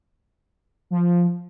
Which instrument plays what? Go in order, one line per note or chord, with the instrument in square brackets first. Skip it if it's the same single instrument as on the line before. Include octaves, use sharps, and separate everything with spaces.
[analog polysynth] F3